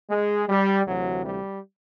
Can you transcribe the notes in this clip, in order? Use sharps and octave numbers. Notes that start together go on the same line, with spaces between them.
G#3
G3
D2 C3 E3 F#3
G3